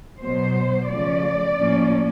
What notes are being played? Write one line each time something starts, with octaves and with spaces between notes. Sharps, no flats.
B2 F#3 B3 C5
C#3 F3 A3 C#4 D5
A2 F3 A#3 C#4